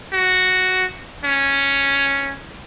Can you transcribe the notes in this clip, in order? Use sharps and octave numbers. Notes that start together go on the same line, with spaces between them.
F#4
C#4